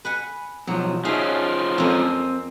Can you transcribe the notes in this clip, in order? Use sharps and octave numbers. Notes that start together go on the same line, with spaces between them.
B4 F#5 G#5
B1 F3 F#3
F3 C#4 D#4 G#4 E5 F5
F2 A#3 C4 G#5